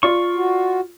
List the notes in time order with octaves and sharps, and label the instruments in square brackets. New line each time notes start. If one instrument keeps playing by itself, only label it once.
[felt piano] F4 D5 [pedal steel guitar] C#6
[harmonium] F#4